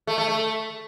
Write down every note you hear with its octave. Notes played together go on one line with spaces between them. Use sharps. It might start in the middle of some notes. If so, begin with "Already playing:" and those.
A3
A3
A3